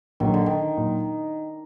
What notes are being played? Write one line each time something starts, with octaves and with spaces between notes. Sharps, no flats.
A#1 A#2 D#3 F#3
D3
D#3
A#2 F#3